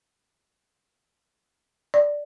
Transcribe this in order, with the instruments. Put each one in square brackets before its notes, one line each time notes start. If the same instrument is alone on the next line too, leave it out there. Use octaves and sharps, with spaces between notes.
[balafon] D5